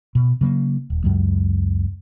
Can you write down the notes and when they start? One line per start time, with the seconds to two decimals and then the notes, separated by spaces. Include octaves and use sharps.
0.15 B2
0.41 C#3 F#3 A#3
0.90 D#1
1.04 C#2 F#2 F#3 G#3